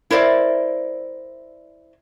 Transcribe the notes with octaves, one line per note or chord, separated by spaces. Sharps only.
E4 A#4 C5 D5 E5